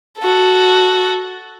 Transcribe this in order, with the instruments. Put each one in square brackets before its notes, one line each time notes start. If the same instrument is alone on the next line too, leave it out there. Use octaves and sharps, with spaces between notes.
[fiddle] F#4 A4